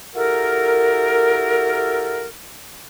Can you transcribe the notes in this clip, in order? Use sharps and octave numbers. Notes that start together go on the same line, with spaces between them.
E4 F#4 G4 A4 A#4